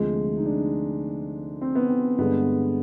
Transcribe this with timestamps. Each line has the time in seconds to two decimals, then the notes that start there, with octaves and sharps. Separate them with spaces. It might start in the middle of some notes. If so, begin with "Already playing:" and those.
Already playing: D2 C3 F3 G#3
0.37 D#4
0.46 D4
1.61 C4
1.75 B3
1.89 C4
2.18 G2 D3 G#3 B3